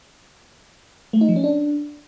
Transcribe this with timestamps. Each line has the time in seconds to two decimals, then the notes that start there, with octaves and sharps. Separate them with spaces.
1.13 A3
1.21 D#4
1.29 F3
1.36 C#4
1.44 D4